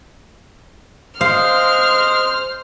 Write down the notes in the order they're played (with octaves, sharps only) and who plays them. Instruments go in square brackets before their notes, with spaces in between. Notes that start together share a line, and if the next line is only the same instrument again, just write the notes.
[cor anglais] G#3 [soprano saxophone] C5 [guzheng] F5 [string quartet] F6